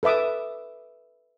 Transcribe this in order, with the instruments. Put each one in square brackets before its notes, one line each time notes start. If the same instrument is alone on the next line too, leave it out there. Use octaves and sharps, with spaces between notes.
[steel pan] A4 B4 E5 D6 D#6